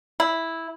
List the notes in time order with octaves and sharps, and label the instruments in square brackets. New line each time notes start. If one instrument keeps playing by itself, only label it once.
[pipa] E4